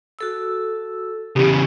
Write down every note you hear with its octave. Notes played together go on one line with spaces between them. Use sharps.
F#4 A4 E6
C#3 E3 G4